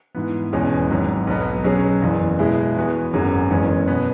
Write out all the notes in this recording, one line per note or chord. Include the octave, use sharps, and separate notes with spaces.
G#2 E3 B3
E1 E2 B2 G#3 C#4
G#1 G#2 F#3
B1 B2 F#3 B3
B2 F#3 C#4 G#4
F#1 E2 C#3 E3
B2 G#3 E4 G#4
E2 E3 B3 F#4
G#1 F#2 F#3 C#4 G#4
F#1 E2 E3 G#3 C#4
B2 B3